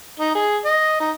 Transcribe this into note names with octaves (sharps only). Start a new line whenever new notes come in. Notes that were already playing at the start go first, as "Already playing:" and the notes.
D#4
G#4
D#5
D#4